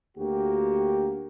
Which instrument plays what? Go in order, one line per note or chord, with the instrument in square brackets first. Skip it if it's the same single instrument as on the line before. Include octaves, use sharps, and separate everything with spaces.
[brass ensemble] D2 A#3 F#4 G4